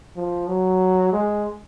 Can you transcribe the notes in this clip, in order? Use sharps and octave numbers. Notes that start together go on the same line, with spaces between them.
F3
F#3
G#3